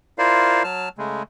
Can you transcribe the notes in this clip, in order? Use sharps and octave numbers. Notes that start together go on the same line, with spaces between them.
E4 F4 A#4 C5 D5 F5
F#3 A5 F6
C#3 G#3 A3